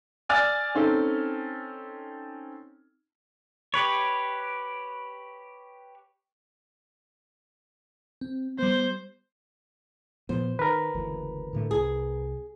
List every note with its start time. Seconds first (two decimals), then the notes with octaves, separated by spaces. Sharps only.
0.29 D5 G#5 E6 F6 A6
0.75 C4 C#4 D#4 A4
3.74 G4 B4 C#5
8.21 C4
8.59 G3 B3 C5
10.29 A#2 F3 B3 C5
10.59 D#3 A#4 B4
10.94 F#1 D2 E3
11.53 A2 D3 A3
11.71 C2 G#4